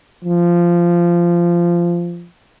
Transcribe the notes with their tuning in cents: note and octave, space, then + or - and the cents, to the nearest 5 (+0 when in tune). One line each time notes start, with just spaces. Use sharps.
F3 -15